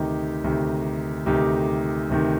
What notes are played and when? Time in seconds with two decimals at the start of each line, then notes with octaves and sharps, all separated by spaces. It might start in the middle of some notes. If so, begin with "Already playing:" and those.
Already playing: D2 C3 D#3 D#4 G4
0.44 D2 C3 D#3
1.26 D2 C3 D#3 D#4 G4
2.10 D2 C3 D#3